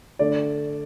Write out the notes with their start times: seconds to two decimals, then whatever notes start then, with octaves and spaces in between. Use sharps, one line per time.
0.19 D3 A3 D5